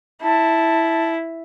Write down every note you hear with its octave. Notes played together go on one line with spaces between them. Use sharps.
E4 A5